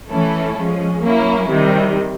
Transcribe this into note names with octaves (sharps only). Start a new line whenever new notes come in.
E3 A3 C#4 E4 A4
F3 G#3 C#4
F#3 A#3 C#4 E4
C3 D#3 G3